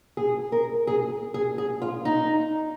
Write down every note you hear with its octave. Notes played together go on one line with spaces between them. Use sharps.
G#4
A#4
G#4
G#4
G#4
F4
D#4